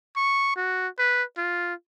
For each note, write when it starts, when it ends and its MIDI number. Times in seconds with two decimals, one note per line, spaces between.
0.16 0.55 85
0.56 0.88 66
0.99 1.23 71
1.38 1.74 65